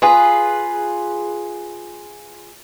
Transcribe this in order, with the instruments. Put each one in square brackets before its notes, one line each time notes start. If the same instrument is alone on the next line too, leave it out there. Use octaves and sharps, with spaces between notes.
[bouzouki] F4 G#4 B4